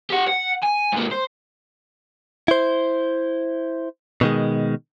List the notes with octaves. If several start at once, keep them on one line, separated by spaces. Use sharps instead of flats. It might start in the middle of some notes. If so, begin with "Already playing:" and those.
G4 F#5
F#5
G#5
G#2 A#3
C5
E4 C5
B2 D#3 G#3